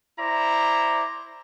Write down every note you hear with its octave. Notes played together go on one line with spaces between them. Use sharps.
E4 C5 D5 A#5